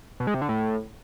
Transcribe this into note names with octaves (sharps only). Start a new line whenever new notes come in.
B2
G#3
C3
D3
A2